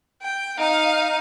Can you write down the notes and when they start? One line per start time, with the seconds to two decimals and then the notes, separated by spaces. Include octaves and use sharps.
0.22 G5
0.58 D#4 F5